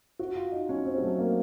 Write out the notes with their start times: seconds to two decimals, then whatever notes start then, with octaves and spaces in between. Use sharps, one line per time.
0.19 F#4
0.35 F4
0.52 D#4
0.69 C#4
0.85 C4
0.98 F#3
1.03 A3
1.19 A#3